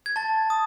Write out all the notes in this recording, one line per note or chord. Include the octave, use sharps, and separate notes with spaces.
G#6
A5 A6
D#6